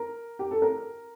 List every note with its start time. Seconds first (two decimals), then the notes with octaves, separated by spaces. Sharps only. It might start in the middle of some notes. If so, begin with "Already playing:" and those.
Already playing: A#4
0.39 G4
0.51 A4
0.62 A#4